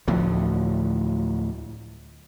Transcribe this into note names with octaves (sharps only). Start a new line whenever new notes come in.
D2 A2 F3 F#3